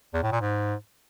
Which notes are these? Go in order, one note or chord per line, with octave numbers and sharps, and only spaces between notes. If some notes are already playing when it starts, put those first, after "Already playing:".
E2
A2
A#2
G#2